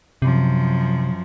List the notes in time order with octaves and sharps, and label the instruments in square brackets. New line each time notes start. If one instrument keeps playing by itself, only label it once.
[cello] F#2 F3 [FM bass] C3